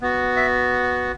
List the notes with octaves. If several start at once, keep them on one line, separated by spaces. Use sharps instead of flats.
B3 F#4
E5